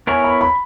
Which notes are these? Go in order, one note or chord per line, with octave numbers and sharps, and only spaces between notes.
B3 E4 A#4 C#5 G#5
B5
B5